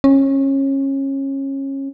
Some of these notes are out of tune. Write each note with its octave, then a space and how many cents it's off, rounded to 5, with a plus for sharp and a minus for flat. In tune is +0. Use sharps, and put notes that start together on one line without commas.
C#4 -25